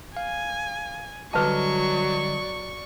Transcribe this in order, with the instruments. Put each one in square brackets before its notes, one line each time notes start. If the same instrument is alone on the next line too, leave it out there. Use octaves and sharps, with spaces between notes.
[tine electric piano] F5 [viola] G#5
[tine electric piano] D3 G3 D#5 [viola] F#3 [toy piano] B4 A5 [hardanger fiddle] D5 C#6